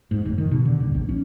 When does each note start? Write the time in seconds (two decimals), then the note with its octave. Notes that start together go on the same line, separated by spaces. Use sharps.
0.11 G#2
0.25 F1
0.38 D#3
0.51 B2
0.65 D3
0.80 D#1
0.94 A#1
1.09 C#4